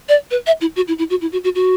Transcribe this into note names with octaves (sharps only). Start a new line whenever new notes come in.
D5
B4
E5
E4
F#4
E4
E4
F#4
E4
F#4
F#4
F#4